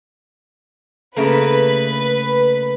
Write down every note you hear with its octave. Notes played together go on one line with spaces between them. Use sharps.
C#3 A3 A#3 B4